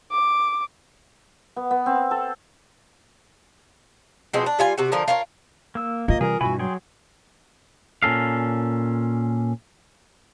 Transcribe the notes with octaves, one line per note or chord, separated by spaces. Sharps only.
D6
B3
B3
C4
A4
B2 F3 G#3 C4
D4
G3 F4 G#5
C3 F#4
D3 F3 A#4
F4 A#4 C#5
A#3 E6
A#3 F4 D#5
C3 E3 G3 G#4 A#4
G2 B2 E3 F#4 G#5 B5
F#3 G#4 G5 C6
A#2 C#4 A4 F5